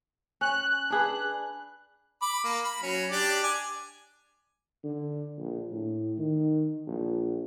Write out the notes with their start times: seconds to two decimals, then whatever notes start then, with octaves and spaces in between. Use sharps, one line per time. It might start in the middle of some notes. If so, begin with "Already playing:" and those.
0.41 C#4 F#6
0.90 D4 G#4 B4
2.22 B5 D6
2.44 A#3
2.64 B5
2.82 F#3 C#4
3.10 D4 G4 D5
3.43 G#5 D6
4.84 D3
5.38 A#1
5.72 A2
6.18 D#3
6.87 A#1